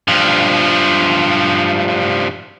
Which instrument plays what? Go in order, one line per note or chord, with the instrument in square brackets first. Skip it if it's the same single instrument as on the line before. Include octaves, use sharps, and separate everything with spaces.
[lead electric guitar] G2 F3